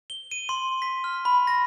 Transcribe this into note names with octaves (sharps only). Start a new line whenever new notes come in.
G7
D#7
C6
B6
F6
B5
A#6